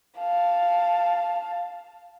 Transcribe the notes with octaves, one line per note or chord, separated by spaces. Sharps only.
F5 A5